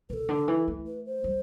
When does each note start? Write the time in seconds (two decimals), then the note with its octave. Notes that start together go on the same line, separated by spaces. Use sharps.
0.09 B2 A4 B4
0.29 D3
0.48 E3
0.68 A3
0.86 B4
1.06 C5
1.24 G3